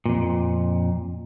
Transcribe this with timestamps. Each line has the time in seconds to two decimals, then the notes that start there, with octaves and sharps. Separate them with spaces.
0.05 F2 A#2